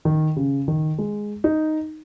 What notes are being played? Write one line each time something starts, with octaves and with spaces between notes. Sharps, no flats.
D#3
C#3
D#3
G#3
D#4